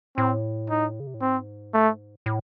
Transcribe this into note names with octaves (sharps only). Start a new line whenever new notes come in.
A2 C4
D#4
C#3
C3
A2
G#2 C4
A3
A2